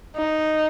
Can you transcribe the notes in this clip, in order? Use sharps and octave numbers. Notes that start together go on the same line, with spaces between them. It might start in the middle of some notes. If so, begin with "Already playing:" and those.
D#4